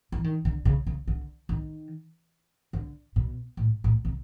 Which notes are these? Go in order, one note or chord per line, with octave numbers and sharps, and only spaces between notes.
E3
D#3
D3
C#3
C#3
D3
D#3
D3
B2
A2
A2
C3